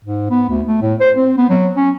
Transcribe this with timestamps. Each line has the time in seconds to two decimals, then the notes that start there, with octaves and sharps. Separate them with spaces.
0.04 G#2
0.30 B3
0.50 D2
0.68 A3
0.82 A2
1.00 C5
1.16 C4
1.38 B3
1.50 F#3
1.77 C#4